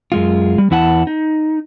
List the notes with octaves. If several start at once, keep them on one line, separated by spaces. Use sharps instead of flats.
F#2 G#3 F4
G3
E2 E4 F#5 G#5 A5
D#4